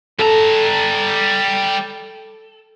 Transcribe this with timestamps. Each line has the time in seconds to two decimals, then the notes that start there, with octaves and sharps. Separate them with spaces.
0.19 G3 A4 A#5